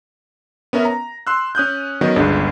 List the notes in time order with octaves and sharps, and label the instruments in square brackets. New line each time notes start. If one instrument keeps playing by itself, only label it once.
[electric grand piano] B3 C#4 A#4 E5
A#5
C6 E6 F#6
C#4 D#6 F#6 G6
D#3 F#3 B3 C#4 D#5
G1 C#2 C#3 D4